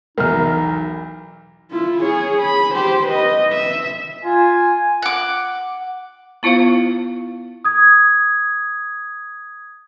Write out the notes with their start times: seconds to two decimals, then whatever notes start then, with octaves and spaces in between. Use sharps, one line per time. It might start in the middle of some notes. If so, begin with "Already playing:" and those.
0.18 B1 E2 D#4 A#4 F6
1.71 E4 F4
2.01 G#4 C#5
2.42 B5
2.75 G4 C5
3.06 B4 D#5
3.53 E5
4.25 F4 G#5
5.02 F#5 D6
6.43 B3 E4 F4 C5 F5
7.64 D#6 G#6